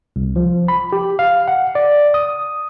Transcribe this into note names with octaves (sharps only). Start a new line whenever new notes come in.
C2
F3
B5
G4
F5
F#5
D5
D#6